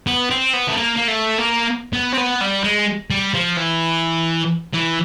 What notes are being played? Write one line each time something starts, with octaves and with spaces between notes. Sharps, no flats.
B3
C4
B3
A3
A#3
A#3
A3
A#3
B3
C4
B3
G3
G#3
G3
F3
E3
E3